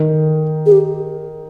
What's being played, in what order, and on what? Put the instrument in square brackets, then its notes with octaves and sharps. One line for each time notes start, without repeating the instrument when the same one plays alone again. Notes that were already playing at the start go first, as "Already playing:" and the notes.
Already playing: [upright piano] D#3
[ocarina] G#4
G4